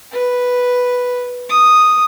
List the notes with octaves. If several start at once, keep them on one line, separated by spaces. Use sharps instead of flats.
B4
D#6